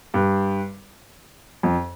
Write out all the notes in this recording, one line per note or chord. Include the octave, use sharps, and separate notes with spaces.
G2
F2